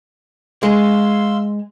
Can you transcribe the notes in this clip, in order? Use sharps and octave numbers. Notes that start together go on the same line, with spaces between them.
G#3 F5 C6 E6